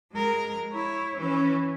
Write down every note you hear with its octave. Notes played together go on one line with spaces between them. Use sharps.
G#3 A#4
E4 C#5
E3 C#4